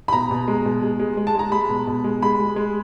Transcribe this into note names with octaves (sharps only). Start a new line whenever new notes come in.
B5
B2 A#5
B2
G#3
B2
G#3
G#3
G#3
A5
G#3 A#5
G#3 B5
B2
B2
G#3
G#3 B5
G#3
G#3